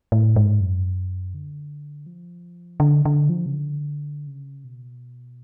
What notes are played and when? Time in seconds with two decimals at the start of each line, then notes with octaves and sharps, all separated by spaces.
0.12 A2
0.36 G#2
0.61 F#2
1.34 D3
2.06 F3
2.80 D3
3.05 D3
3.29 F3
3.46 C#3
3.54 D3
4.27 C#3
4.64 B2